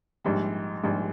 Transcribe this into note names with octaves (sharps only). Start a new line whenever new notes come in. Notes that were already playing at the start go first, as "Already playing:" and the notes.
A#1 G#2 G3
A#1 G#2 G3